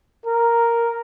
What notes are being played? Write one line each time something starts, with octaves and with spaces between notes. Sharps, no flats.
A#4